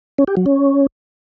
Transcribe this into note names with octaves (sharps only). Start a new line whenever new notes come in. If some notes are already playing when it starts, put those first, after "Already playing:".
C#4
G4
F#3
C#4